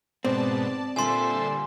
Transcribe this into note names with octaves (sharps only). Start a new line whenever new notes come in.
G#2 B2 C4 D5 A5
A#2 D3 G3 A4 C5 E5 G#5 C6